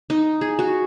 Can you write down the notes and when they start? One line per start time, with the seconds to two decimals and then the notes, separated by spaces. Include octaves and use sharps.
0.10 D#4
0.41 G#4
0.59 F#4